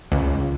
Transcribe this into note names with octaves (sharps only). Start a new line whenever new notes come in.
C#2